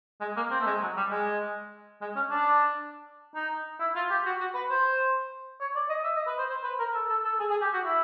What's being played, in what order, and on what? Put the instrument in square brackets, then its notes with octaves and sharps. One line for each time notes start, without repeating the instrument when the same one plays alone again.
[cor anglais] G#3
A#3
C4
A3
G#3
F#3
G3
G#3
G#3
C#4
D4
D#4
E4
F4
G4
F#4
F#4
B4
C5
C#5
D5
D#5
E5
D#5
B4
C5
C5
B4
A#4
A4
A4
A4
G#4
G#4
G4
F#4
E4